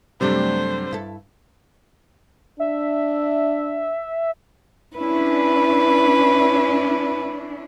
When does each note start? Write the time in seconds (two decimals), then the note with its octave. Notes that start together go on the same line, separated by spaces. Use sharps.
0.21 F#2 C3 F#3 G3 A3 D4 C5
0.91 G2 E4 A4
2.60 D4 E5
4.97 C#4 D4 E4 B4